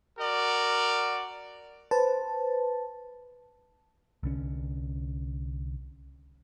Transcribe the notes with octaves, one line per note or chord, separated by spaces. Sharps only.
F#4 A#4 D5
B4 C5 A5
C2 D3 C#4